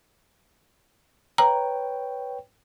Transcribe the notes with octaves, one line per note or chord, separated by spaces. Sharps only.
B4 C#5 G5 A#5